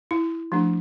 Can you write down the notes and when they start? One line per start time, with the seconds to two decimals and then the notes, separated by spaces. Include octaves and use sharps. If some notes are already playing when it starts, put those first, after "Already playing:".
0.11 E4
0.52 F3 A3 D4